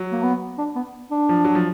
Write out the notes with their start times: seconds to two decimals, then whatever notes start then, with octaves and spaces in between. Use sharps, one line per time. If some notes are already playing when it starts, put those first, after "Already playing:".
Already playing: F#3
0.12 A#3
0.23 B3
0.58 D4
0.76 B3
1.11 D4
1.29 F3
1.45 F#3
1.55 F3